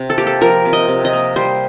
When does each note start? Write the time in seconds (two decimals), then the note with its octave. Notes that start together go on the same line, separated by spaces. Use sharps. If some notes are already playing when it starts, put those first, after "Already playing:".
Already playing: C3
0.10 A4
0.18 A#3 G4
0.27 A4
0.41 F3 A#4
0.65 C3
0.73 D#5
0.88 C3
1.05 D#5
1.13 A#3
1.36 G3 C5